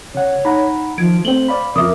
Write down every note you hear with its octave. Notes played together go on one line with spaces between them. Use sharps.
C#3 C#5 F#5
D#4 F#5 A#5 B5
D#3 F3 G#6 D7
A3 C4 C5 F#7 G7
D5 F5 B5
F2 C#3 F4 A#4 E5 D6 D#6